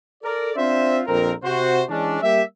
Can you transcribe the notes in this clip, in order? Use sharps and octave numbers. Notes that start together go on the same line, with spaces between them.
A4 A#4 D5
C4 D4 F4 C5 E5
A#1 F2 C4 A#4
C3 F#4 C5
E3 G#3 C#4 D4
G3 A#3 G4 E5